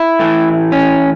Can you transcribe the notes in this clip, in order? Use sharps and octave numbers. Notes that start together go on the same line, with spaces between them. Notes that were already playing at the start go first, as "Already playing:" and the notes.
Already playing: E4
A2 E3 A3
C#4